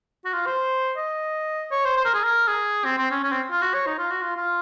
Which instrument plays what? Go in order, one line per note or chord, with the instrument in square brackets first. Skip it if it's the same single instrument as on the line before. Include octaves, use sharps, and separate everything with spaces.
[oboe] F#4
F4
C5
D#5
C#5
C5
C5
A#4
G#4
A#4
G#4
C4
C4
C#4
C#4
C4
F4
F#4
C#5
D#4
F4
F#4
F4
F4